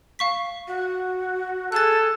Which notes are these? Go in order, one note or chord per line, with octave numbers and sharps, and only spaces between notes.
F5 C#6 B6
F#4
G#4 A4 F#6 A6